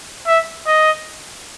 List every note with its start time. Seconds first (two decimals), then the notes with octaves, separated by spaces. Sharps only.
0.27 E5
0.67 D#5